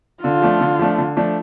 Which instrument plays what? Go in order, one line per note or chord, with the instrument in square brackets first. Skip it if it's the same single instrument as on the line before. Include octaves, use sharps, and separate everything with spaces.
[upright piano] D3 [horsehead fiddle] F4
[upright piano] F3 A3 D4
D3
F3 A3 D4
D3
F3 A3 D4